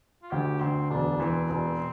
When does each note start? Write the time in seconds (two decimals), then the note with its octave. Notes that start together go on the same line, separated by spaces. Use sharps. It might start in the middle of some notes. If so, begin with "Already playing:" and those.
0.22 F4
0.31 D2 G4
0.61 D2 C4
0.90 E1 D4
1.20 E3 C4
1.50 E1